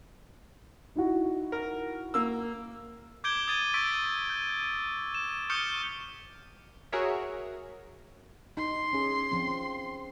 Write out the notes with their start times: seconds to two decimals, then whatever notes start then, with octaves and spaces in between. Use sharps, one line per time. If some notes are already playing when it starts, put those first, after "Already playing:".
0.96 D#4 E4 F#4
1.52 A#4
2.14 A#3 E6
3.24 D6 G6 G#6 D7 G7
3.47 D#6 G#6 A6 D#7
3.74 C#6 E6 A6 B6 D7
4.30 G6
5.14 E7
5.50 C#6 D#6 F6 G6 C#7 G7
6.92 F#4 G#4 A#4 C#5 E5
8.57 D#4 C6
8.93 C#4 G#4
9.32 F3 C4